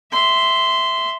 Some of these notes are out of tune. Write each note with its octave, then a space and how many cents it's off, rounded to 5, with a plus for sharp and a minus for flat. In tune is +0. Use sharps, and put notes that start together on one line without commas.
E5 +0 C6 -10